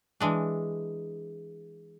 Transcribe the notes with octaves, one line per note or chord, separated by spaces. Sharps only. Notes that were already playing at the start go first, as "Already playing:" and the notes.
E3 G#3 D4